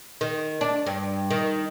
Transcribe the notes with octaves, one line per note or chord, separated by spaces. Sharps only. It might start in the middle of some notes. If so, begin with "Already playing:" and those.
D#3
D4
G2
D#3